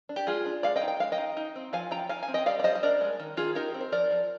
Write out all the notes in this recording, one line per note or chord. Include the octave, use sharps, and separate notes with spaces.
D4
G4
G#3 F4 G#4
D4
G#3 D5 F5
D#5 G5
D#4
G5
G#3 F5
D#5 G5
D#4
D#4
C4
F3 F5 G#5
F3 G5 A#5
D#4 F5 G#5
F5 G#5
C4
D#5 G5
G3 D5 F5
D5
G3 C5 D#5
D#5
D4 A#4 D5
G#3
D#3
D#3 F4 G#4
D#4 G4 A#4
C4
C5
F3 A#4 D5
F3